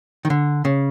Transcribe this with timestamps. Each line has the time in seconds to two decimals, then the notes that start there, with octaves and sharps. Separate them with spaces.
0.25 D#3
0.30 D3
0.65 C#3